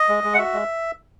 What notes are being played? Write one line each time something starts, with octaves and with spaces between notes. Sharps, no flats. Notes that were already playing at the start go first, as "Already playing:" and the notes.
Already playing: D#5
G#3
G#3
F#5
F#4 E5
G#3